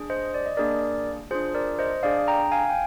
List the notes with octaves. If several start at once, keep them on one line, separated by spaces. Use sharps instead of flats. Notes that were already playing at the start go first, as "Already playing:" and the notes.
Already playing: D4 G#4
C5 D#5
D5
D#5
A#3 D4 G#4 A#4 D5
D4 F4 G#4 C5
A#4 D5
C5 D#5
D4 G#4 D5 F5
G5 A#5
F5 G#5
G5